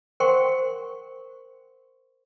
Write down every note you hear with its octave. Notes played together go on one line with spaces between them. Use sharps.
A#4 C5 F#5 G5 C6 C#6